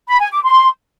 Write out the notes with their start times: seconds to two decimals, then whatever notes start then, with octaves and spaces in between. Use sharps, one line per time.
0.08 B5
0.20 G#5
0.32 D6
0.43 C6